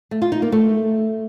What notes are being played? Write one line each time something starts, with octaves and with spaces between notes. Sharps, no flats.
A3
F4
D#4
A#3
A3